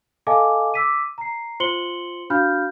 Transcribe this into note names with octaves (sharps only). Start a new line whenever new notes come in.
A4 D#5 F5 G#5 A5 D6
D6 E6 B6 D#7
A#5 C7
F4 C5 C6 C#7 F#7 G7
D4 F#4 F5 B5 F6 G6